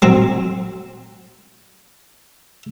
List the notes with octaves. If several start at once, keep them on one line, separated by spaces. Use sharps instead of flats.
F#3 C4